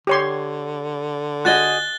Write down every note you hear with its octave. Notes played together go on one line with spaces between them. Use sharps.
D3 G4 C#5 C6
F#4 G#4 D#5 F#6 A6 G7